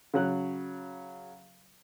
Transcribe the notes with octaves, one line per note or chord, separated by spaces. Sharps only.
C#3 F#3 F#6